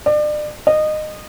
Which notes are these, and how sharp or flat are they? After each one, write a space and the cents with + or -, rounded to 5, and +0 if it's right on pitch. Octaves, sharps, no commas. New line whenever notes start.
D5 +35
D#5 -20